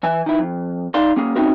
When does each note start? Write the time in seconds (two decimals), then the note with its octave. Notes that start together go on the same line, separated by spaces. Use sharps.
0.03 E3 E5 G#5
0.26 D#3 E4
0.39 F2
0.94 D#4 D5 F5 A5 C6
1.16 A#3 C#4 G#4
1.36 C4 C#4 D#4 E4 F#4 A#4